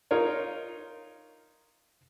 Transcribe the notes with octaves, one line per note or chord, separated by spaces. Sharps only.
D#4 F4 A#4 C#5